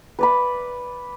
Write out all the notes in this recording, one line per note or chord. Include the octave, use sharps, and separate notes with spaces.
B4 D5 B5